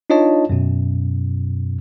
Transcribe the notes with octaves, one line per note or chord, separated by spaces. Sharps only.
D4 D#4 F4 C#5 D#5 A5
F#2 B2